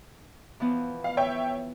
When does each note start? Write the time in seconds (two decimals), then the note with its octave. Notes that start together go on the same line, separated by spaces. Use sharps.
0.60 E3 F3 B3
1.04 F5
1.17 C#5 E5 G5